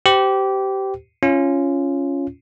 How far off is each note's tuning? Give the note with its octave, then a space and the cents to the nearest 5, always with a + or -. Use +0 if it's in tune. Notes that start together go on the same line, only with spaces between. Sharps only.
G4 -20 C5 -30
C#4 +0 F4 -15